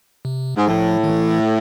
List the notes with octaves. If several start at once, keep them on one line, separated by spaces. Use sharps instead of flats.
C3
G#2
A2 F3
D#3
E3